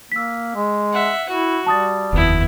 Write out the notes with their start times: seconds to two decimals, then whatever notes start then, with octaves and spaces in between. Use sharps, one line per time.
0.12 A#3 E6 B6
0.55 G#3
0.93 E5 F#5
1.29 E4 F#4
1.66 G3 A5 D#6 A6
2.13 F1 D#2 B3 E4